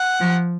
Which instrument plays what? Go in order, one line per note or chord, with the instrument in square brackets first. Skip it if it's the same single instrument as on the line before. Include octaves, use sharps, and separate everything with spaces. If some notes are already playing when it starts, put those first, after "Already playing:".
Already playing: [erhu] F#5
[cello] F3